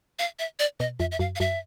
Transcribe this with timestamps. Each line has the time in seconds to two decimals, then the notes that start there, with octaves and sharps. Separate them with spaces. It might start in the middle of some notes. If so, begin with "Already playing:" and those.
0.19 F5
0.39 E5
0.59 D5
0.80 B2 D#5
1.00 F2 E5
1.12 E5
1.19 F#2 F5
1.36 F5
1.40 F#2 E5